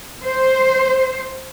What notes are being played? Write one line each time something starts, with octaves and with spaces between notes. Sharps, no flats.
C5